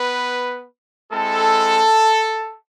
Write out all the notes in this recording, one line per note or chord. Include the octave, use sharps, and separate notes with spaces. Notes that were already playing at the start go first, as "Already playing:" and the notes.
Already playing: B3 B4
G#3 C4 E4 A4